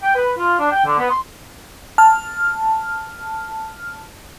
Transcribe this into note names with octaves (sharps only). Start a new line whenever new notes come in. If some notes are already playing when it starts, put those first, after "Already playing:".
G5
B4
F4
D4
G5
D3
B3
C6
A5 F6